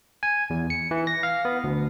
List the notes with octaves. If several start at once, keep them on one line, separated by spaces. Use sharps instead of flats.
G#5
E2
C#7
E3
A#6
F5
B3
D2